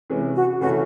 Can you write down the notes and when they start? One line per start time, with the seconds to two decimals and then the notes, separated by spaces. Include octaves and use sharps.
0.10 C3 E3 G#3 C#4
0.35 F#4
0.61 C#3 E3 A3 C#4 F#4